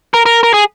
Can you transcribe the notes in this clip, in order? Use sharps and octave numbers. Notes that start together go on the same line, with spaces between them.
A#4
A#4
A#4
G#4